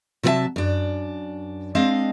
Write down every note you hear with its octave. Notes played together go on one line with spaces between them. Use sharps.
C3 F#3 A4 B4 E5 A5
F#2 D4
G#3 C4 D4 D#5 F5